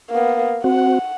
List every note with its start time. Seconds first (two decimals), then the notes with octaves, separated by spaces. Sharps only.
0.10 A#3 B3
0.64 C4 F#4 F#5